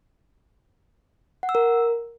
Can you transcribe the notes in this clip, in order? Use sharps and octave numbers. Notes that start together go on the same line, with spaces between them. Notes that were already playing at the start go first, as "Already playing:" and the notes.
F#5
E6
A#4